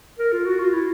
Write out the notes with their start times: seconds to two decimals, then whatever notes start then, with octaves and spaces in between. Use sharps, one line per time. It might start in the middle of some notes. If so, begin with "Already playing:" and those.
0.19 A#4
0.32 F4
0.46 F#4
0.60 F4
0.74 E4